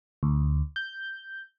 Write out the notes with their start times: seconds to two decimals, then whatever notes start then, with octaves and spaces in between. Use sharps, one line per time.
0.23 D2
0.76 G6